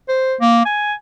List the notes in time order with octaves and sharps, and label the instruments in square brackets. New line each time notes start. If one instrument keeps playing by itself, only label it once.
[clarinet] C5
A#3
G#5